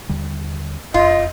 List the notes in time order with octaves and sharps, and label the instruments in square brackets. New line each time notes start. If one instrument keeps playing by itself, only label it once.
[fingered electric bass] D#2 D3 G3
[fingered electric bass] E1 F2 [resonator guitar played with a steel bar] F4 [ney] D#5